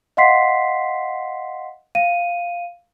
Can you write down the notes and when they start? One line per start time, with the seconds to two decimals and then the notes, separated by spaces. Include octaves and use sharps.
0.17 D#5 F5 F#5 C6 B6 C7
1.95 F5 D#7